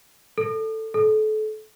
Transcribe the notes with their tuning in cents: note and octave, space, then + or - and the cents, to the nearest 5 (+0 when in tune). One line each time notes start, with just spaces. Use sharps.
A4 +10
A4 -30